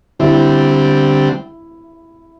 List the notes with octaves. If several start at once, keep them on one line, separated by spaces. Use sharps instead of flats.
D3 G3 C4 E4